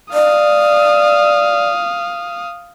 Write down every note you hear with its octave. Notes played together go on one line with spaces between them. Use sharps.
D5 F5 D#6